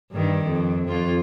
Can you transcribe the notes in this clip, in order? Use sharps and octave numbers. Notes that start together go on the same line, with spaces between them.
G2 D#3
F2
F2 F4